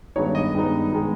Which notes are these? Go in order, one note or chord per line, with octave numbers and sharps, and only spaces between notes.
G2 D#3 G#3 B3 D#4 C#5
D#5
G2 D#3 G#3 B3 D#4
D#3 G#3 B3 D#4